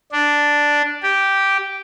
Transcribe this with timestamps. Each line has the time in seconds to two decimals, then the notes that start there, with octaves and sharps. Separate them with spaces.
0.12 D4
1.03 G4